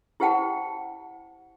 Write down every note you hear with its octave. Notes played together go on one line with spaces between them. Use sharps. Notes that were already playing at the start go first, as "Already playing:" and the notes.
E4 G4 C5 F#5 G5 A5